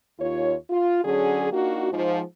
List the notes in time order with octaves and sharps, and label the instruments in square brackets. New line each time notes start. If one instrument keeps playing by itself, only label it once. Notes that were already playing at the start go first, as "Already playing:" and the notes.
[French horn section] D#2 F4 C#5
F4
D3 F#3 C#4 D4 G#4
A#3 D4 D#4 F4 F#4
G#2 F3